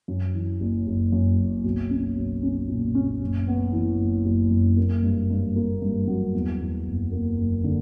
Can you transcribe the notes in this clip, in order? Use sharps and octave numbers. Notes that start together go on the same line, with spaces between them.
F#2
E3
F#1
F#1
F#2
F#1
B1
C#4
B1
C#4
A#2
C#4
F#1
B3
E3
F#1
F#1
F#2
A#3
G2
G2
A#3
G2
F#3
E2
E2
F#1
A#3
F#1
D3